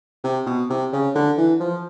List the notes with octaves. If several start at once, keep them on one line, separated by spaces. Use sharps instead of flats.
C3
B2
C3
C#3
D3
E3
F3